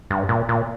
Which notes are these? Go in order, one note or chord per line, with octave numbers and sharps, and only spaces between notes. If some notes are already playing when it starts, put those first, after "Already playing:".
G2
A#2
A#2